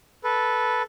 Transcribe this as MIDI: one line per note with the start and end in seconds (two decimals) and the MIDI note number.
0.24 0.82 69
0.24 0.82 71